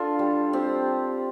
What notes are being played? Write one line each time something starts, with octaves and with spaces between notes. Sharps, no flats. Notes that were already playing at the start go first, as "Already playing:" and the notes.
Already playing: D4 F4 A4
G3
C4 G4